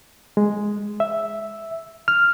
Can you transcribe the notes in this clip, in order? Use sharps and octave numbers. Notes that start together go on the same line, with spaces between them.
G#3
E5
F6